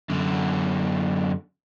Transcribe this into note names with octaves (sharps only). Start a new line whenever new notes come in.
F#2 D3